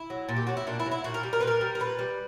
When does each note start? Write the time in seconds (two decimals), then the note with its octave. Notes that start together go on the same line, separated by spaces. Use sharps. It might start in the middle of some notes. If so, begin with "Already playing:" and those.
Already playing: E4
0.10 F#3
0.29 A#2
0.36 G4
0.47 F#3 F#4
0.57 E4
0.67 A#2 D4
0.80 E4
0.86 F#3
0.91 E4
1.04 A#2 F#4
1.14 A#4
1.23 G3
1.33 A#4
1.40 A#2 B4
1.47 A#4
1.61 G3
1.75 A#4
1.80 A#2 B4
1.99 G3